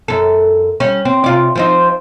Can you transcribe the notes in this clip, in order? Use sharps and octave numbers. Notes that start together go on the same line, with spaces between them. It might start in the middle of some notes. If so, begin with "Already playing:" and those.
F#2 A4
G3 C#4
C4
C3 F4 D5
F3 C4 D#4